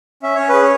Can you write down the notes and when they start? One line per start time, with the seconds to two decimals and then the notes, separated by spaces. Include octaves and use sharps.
0.23 C#4 E5
0.35 C#4 C#5
0.49 G#4 B4
0.62 C#5